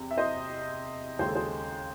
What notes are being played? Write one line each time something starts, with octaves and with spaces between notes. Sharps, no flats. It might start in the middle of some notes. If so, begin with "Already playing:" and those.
Already playing: E2 C3
E5
C5 D#5
D#2 C#3 G#3 C5
A4
G#4 C5